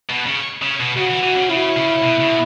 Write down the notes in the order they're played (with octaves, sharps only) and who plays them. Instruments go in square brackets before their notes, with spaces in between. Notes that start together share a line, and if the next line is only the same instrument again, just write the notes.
[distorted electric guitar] B2
C#3
C#3
B2
[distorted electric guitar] C#3 [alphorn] F#4
[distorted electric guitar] E3
E3
C#3
[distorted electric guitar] C#3 [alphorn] E4
[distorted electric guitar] C#3
B2
C#3
B2